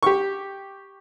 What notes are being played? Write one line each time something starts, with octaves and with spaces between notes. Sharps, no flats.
G4 C#6